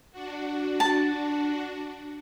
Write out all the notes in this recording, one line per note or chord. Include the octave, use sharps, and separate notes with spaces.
D4 F#4
A5